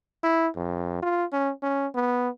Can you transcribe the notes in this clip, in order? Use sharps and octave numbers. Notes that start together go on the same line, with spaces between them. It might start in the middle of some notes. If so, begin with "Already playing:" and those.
E4
F2
F4
C#4
C#4
B3